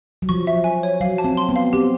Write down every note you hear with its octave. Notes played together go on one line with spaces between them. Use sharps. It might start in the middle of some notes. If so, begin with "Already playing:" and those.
F#3
F3 C#6
E5
G#5
C#5
F#3 F5
A5
C4
C6
B3
F5
C4 G4